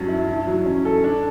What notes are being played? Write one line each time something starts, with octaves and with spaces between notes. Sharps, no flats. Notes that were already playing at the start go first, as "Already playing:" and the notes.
Already playing: G2 F#3 C#4
E4
E4
F#3
C#4
A4
D4